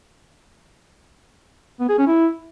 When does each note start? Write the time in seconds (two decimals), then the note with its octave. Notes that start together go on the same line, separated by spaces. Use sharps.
1.80 B3
1.89 G#4
1.98 C#4
2.07 E4